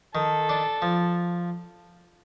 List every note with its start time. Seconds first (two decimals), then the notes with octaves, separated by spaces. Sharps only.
0.15 D#3 A4
0.49 D4
0.82 F3